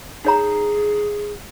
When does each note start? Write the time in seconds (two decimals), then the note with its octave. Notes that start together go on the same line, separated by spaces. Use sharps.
0.25 D#4 G#4 C#5 A#5